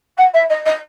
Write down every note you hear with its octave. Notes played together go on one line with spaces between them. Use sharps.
F#5
E5
D#5
D#5